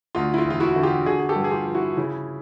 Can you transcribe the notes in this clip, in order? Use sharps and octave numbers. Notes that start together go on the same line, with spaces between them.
D2 F4
E4
F4
E1
F4
E4 F#4
D3
F4 G4
D3 F#4 G#4
G#4
G4 A4
G2
G#4
F4 G4
F3
E4 F#4
C#3 E4